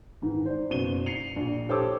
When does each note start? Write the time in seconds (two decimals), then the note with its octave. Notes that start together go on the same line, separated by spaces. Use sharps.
0.22 G#2 D#3 E3
0.46 C5 D5
0.70 F#1 B2 D#7 G7
1.06 C7 C#7 F7
1.36 A#1 A#2
1.69 G4 A4 C5 C#5 D6 E6